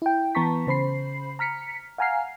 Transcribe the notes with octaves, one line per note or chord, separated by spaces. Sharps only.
E4 G5
E3 B3 A5 A#5 C#6 B6
C#3 C5 B5 C7
A#5 F6 B6 C#7
F5 F#5 G#5 A#5 F6 C7